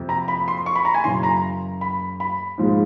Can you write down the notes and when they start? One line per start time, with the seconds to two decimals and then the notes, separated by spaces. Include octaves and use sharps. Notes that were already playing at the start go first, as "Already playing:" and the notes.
Already playing: F2 C3
0.09 A#5
0.28 B5
0.48 C6
0.66 C#6
0.76 B5
0.85 A#5
0.94 G#5
1.04 F#2 C#3 E3 C6
1.23 A#5
1.81 B5
2.20 B5
2.58 G#2 F3 G#3